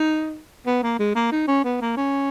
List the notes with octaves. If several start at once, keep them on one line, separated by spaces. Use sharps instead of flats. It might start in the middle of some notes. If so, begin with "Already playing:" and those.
Already playing: D#4
B3
A#3
G#3
A#3
D#4
C#4
B3
A#3
C#4